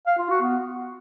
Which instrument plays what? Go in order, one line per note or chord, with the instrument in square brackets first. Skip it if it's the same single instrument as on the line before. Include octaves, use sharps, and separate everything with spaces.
[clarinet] F5
F4
F#4
B3